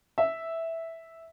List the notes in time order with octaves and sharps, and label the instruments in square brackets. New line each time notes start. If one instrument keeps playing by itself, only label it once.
[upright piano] E5